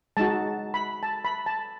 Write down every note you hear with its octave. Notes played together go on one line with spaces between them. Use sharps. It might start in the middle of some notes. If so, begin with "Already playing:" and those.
G#3 D#4 F#4 A5
B5
A5
B5
A5